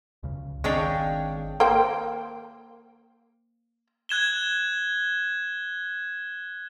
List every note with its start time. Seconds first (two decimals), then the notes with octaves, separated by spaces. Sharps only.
0.23 C#2 C#3
0.64 G#1 D#3 G#3 C4 D4 C#5 F5 G5
1.60 A#3 C5 G5
4.09 F#6 G#6 E7 G7